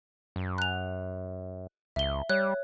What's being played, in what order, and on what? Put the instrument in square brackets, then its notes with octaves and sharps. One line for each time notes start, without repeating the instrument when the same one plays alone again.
[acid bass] F#2
[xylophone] F#6 F7
[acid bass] C#2 [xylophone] E5 G7
[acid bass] G3 [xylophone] C#5 F#6